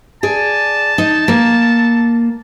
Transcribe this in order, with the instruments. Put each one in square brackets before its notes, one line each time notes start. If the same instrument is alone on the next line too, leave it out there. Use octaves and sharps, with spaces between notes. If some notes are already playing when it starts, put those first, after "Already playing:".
[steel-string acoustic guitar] G#4 D5 [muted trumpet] A5
[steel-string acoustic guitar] D#4
A#3